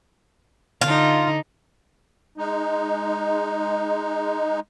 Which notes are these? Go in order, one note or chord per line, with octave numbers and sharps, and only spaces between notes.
D3 D#4 F4
G#3 D#4